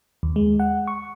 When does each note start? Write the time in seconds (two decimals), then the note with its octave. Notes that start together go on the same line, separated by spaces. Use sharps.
0.23 D#2
0.36 G#3
0.60 F#5
0.87 C#6